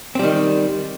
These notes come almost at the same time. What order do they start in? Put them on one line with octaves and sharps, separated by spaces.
C4 G3 D#3